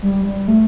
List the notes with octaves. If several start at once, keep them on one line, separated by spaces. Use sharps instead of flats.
G3
G3
A3